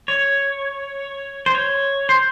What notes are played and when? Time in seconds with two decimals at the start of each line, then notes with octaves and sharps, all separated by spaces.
0.08 C#5
1.46 C5
1.55 C#5
2.09 C5